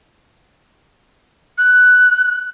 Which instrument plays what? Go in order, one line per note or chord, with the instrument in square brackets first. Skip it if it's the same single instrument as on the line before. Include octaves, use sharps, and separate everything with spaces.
[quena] F#6